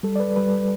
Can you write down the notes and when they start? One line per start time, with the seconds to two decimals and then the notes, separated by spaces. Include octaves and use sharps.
0.03 G3 A4
0.16 D5
0.20 B4
0.36 G3 B4